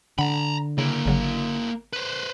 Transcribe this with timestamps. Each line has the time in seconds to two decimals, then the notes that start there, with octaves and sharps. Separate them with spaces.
0.19 D3 F#5 A#5 B5
0.78 C#3 A#3 E4
1.06 G#1 C#3 F#3
1.93 B4 C5